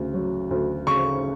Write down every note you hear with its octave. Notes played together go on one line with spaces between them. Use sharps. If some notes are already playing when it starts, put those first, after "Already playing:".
Already playing: D2 C#3
F#3
D2
C#3 C#6